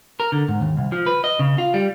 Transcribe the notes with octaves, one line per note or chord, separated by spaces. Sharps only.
A#4
D3
G#2
D#2
C2
F3
B4
D#5
C#3
F4
G3